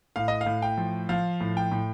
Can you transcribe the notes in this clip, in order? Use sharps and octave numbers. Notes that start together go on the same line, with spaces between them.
A2 F5
D#5
F5
A2
G5
F3
F3 F5
A2
G5
A2